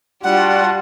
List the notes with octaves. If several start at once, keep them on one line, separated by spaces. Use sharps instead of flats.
G3 D4 F4 F#4 F#5